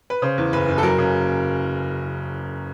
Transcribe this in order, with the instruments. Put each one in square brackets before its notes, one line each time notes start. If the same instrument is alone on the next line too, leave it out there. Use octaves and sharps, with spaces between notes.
[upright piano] B4
C#3 C5
E2
F#1 B4
F#1
A4
F#3 A#4
C#3